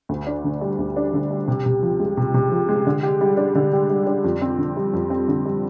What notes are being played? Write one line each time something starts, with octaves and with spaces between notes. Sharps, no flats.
D2
D4
D3
G3
D2
D4
D3
G3
C3
C3
F3
G#3
C3
C3
F3
G#3
D3
G4
G3
D4
D3
G4
G3
D4
F2
C4
D3
G3
F2
C4
D3
G3